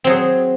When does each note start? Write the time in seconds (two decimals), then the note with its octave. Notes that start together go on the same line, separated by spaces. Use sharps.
0.04 C4
0.07 F#3
0.09 G#4